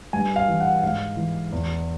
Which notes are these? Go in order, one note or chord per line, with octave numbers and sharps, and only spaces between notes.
G2 G#5
F5
E3
F#5
G#2 F5
E3
E2